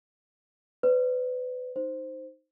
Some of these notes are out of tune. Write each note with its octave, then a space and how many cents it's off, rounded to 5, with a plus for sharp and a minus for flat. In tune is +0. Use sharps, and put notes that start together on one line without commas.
B4 +30 D5 -30
D#4 +0 C5 +0